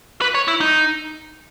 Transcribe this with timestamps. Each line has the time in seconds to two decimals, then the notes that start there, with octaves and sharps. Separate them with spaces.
0.21 B4
0.35 C#5
0.48 E4
0.61 D#4